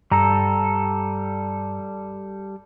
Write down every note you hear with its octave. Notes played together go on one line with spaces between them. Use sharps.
G2 G3 A4 A#5